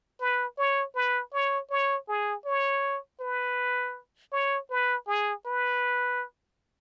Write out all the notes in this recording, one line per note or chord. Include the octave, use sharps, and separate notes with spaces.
B4
C#5
B4
C#5
C#5
G#4
C#5
B4
C#5
B4
G#4
B4